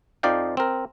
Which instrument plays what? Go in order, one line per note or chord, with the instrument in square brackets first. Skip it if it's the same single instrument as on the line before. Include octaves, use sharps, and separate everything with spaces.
[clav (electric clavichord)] F2 F3 D#4 D5 F5 G5
C4 A#4